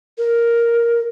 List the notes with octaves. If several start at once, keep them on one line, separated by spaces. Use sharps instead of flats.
A#4